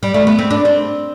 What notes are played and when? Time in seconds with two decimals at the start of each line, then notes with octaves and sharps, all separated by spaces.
0.03 G3
0.14 A3
0.27 B3
0.39 C4
0.51 D4
0.65 C4